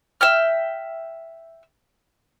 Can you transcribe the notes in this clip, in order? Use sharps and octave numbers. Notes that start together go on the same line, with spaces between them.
E5 G5 F6